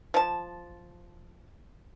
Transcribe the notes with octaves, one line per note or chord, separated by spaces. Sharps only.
F3 A5